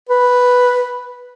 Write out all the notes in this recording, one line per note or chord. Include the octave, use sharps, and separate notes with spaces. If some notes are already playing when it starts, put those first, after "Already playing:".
B4